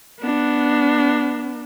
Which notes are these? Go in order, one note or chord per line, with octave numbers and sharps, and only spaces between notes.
B3 D4